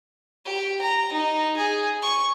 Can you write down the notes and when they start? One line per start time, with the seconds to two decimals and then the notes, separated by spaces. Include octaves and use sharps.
0.45 G4
0.81 A#5
1.13 D#4
1.57 G#4
2.02 C#6